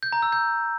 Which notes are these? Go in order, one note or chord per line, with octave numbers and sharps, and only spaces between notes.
G6
A#5
E6
G6